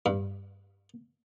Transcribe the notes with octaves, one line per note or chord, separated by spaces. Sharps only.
G2